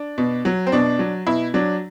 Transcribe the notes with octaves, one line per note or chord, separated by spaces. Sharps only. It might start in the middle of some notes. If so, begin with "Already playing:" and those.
Already playing: D4
B2
F#3
C4
B2 D4
F#3
B2 E4
F#3 D4